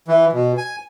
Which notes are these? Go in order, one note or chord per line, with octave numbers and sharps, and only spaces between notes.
E3
B2
G#5